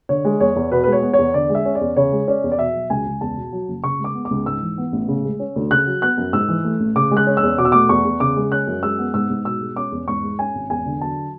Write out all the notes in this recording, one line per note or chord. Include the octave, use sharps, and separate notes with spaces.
D3 C#5
G#3
E2 C#5
E2
B2 B4
G#3 B4
C#5
B3
C#5
E2
D3 D5
G#3
E5
C#4
D5
E2
C#3 C#5
G#3
C#4 D5
E2
D5
B2 E5
F#3
C#2 G#5
C#2
E2 A5
B2
F#3
F#1
C#3 C#6
G#3
D6
B3
D6
C#2
G#2 E6
E3
B3
A1
C#3
G#3
C#4
D2
C#3 F#6
F#3
B3 F#6
F#2
G#2 E6
E3
A3
A1
C#3 D6
G#3
F#6
C#4
E6
E2
B2 D6
E6
A3 D6
E2 C#6
E2
C#3 D6
G#3
C#4 F#6
F#2
G#3 E6
B3
G#2 E6
G#2
B2 E6
G#3
C#4 D6
E2
G#2 C#6
G#3
C#4 G#5
G#1
E2 G#5
D3
F#3 A5